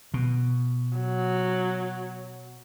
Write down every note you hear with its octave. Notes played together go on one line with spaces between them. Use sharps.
B2
F#3